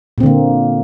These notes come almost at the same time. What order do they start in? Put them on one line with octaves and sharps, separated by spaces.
A#2 C4 D3 A#3